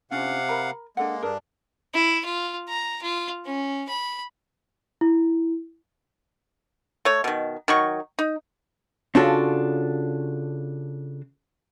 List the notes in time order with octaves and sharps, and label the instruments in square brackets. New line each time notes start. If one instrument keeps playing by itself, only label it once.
[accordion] C3 F5 F#5 [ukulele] C#4 D4 F4
[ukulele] A#4 A#5 B5
[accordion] G#3 A#3 [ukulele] D4 A4 F#5
[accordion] G2 D4 [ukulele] G#4 A#4 B4
[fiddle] E4
F4
A#5
F4
C#4
B5
[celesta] E4
[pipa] A3 C#5
B2 D#3
D#3 F#3 C#6
D#4
[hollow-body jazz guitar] C#3 C#4 D4 F4 F#4 A4